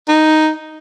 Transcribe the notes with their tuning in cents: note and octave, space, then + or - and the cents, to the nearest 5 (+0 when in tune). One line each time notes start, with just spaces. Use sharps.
D#4 +0